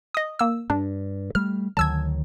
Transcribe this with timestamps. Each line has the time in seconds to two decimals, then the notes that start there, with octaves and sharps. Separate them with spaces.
0.14 D#5 D#6
0.39 A#3 E6
0.70 G2 D4
1.35 G3 A3 F6
1.77 D2 D#3 F#3 A5 E6 G#6